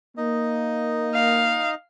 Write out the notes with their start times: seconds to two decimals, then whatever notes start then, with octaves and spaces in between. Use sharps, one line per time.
0.17 A#3 D#4 D#5
1.14 F5